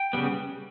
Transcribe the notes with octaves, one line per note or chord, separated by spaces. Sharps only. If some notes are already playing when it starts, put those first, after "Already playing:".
Already playing: G5
C#3 G3 B3